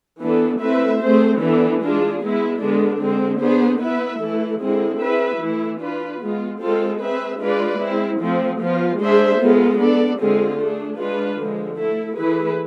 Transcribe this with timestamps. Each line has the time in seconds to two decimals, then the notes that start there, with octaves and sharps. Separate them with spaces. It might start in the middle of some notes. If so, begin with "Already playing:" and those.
0.20 E3 B3 D4 A4
0.60 A3 C4 E4 B4 E5
1.00 A3 C4 G#4 C5
1.39 E3 B3 D4 A4
1.79 G#3 D4 F4 G#4
2.20 G#3 B3 E4
2.59 D3 G#3 B3 D4
2.99 D3 G#3 C4
3.39 B3 D4 G#4 C5
3.79 B3 E4 B4 E5
4.19 E3 A3 E4 A4
4.59 D3 G#3 C4 E4 G#4
4.99 C4 E4 G#4 B4 E5
5.39 E3 A3 E4
5.78 D4 F4 B4
6.19 G#3 B3 F4
6.58 G#3 C4 F4 A4
6.99 C4 G#4 B4 E5
7.39 G#3 D4 F4 B4 D5
7.79 G#3 C4 E4
8.19 F3 A3 C4
8.58 F3 B3 F4
8.98 G#3 D4 G#4 C5 E5
9.38 G#3 B3 F4 A4
9.77 B3 D4 A4 D5
10.18 D3 G#3 C4 F4 G#4
10.57 A3 D4 G#4
10.98 G#3 D4 F4 B4
11.37 D3 F3 G#3
11.77 A3 E4 A4
12.17 E3 A3 E4 G#4 B4